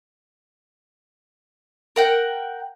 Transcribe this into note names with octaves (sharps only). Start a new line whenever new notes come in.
A#4 F#5 G5